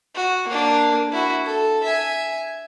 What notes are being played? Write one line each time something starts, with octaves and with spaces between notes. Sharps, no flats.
F#4
A#3 D4
E4 F#4
A4
E5 G#5